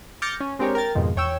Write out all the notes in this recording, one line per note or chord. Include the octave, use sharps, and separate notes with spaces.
D6 F6 G6 A6 A#6 C#7
C#4
G#3 C4 D4 G4 A#4 C#5
A#4 G5 A6
F2 G#2 B2 D#3 F3
E2 C#5 G5 E6